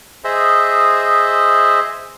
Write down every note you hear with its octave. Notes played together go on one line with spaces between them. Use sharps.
G#4 C5 D#5 E5